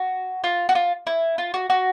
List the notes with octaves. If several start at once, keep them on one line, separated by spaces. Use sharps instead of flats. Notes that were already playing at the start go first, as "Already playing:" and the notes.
Already playing: F#4
F4
F#4
F4
E4
F4
F#4
F#4